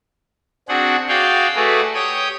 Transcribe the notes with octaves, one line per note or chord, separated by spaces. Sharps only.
C4 D4 F#4 G#4 F#5
F#4 G#4 D5 F5 G5
A3 F#4 G#4 B4 D5
G4 C#5 G5 D#6